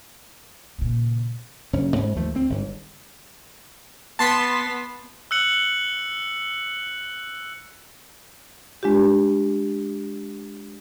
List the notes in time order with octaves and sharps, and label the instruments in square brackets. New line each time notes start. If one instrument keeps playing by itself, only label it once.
[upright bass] A#2 C#3
[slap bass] F#1 G2 C#4
G#2
D#2 F3 A3
D2 C4
G1 G#2
[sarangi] B3 [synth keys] A5 C6 B6
[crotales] E6 F#6 C#7 F#7
[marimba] G#3 D4 F4 G4